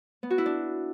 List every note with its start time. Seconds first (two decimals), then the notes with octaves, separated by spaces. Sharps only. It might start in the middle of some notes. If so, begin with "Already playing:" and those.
0.23 B3
0.30 F#4
0.38 E4
0.46 D4